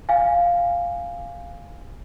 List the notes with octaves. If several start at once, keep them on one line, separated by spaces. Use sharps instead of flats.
F5 G#5